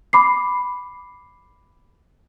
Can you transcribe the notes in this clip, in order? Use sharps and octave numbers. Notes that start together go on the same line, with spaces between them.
B5 D6 C7